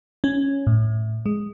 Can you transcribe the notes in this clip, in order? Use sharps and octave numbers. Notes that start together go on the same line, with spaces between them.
C#4
A2
G#3